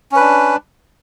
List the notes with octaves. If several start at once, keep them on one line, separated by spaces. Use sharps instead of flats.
C#4 D4 B4